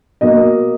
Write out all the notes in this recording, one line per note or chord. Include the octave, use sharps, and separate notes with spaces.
B2 A#3 D#5